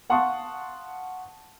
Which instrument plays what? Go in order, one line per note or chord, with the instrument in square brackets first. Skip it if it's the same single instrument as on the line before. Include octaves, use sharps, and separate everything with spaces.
[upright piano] F5 F#5 A5 C6 C#6 D#6